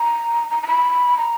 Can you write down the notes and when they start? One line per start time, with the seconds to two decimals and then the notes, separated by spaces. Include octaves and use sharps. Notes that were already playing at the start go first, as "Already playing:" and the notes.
Already playing: A#5
0.50 A#5
0.63 A#5
0.67 B5
1.18 A#5